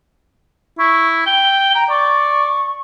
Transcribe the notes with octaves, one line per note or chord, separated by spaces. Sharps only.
E4 C#6
G5 G7
G5 A#5
D5 C#6